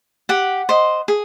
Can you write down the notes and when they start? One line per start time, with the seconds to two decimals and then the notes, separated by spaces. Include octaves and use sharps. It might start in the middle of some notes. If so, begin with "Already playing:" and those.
0.29 G4 F#5
0.69 C5 D#5
1.08 G#4